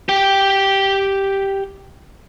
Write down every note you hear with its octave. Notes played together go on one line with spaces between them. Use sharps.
G4 G5